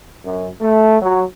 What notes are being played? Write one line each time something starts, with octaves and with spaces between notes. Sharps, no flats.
F#2
A3
F#3